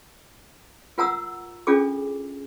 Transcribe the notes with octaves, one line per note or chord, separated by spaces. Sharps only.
F4 A#4 F#5 A#5 D#6 E6
C#4 D4 F4 G#4 A4 D6